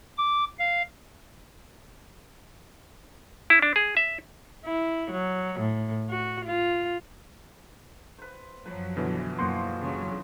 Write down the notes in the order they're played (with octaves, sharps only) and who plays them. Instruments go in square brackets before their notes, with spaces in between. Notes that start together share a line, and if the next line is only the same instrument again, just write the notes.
[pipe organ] D6
F5
[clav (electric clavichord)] E4
D4
G#4
E5
[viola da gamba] E4
F#3
A2
F#4
F4
[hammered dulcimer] B4 C5
[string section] F#2 F3 F#3 [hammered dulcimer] B4
[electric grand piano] B2 D3 E3
[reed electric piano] F#2 A#3 C6 [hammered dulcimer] F3 F#4 C5
[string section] C#3 F#3